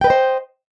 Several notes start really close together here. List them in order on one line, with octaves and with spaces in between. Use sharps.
G5 B4 D#5 C5